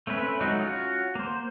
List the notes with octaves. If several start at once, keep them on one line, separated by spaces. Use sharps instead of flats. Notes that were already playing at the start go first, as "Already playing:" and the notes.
A3 C4 C#4 B4 E5
F#3 G#3 A3 D#4 F#4
C#4 F4 F#4
A#3 C5